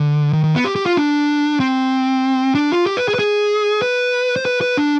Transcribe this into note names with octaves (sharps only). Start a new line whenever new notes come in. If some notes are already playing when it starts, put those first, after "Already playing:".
Already playing: D3
D#3
D#3
B3
G4
G4
F4
D4
C4
D4
F4
G4
B4
G#4
B4
G#4
B4
C5
B4
B4
D4